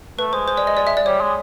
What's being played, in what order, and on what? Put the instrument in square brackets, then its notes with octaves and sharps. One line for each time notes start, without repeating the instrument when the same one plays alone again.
[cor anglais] A3 [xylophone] B4
[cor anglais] G#3 [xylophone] C5
[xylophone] C5
D5
D#5
D5
E5
D5
[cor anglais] G3 [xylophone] C#5
[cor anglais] G#3